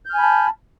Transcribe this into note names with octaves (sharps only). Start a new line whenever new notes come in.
G#5 A5 B5 F6 G6